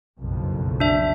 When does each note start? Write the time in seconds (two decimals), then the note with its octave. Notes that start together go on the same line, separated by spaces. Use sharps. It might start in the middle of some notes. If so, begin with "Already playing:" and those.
0.19 F#1 B1 F2
0.80 D4 E5